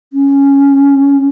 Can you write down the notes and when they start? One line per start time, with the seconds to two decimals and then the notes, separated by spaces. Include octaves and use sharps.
0.13 C#4